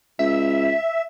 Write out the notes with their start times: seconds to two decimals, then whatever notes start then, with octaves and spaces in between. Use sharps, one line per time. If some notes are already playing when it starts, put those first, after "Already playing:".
0.19 C#2 E5